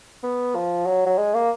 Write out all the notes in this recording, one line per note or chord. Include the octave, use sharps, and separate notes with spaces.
B3
F3
F#3
F#3
G#3
A#3